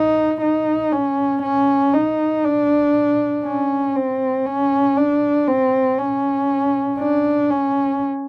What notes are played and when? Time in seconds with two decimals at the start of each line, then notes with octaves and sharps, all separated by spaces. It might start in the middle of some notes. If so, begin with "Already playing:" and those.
Already playing: D#4
0.41 D#4
0.92 C#4
1.42 C#4
1.93 D#4
2.44 D4
3.45 C#4
3.96 C4
4.46 C#4
4.97 D4
5.48 C4
5.99 C#4
6.99 D4
7.50 C#4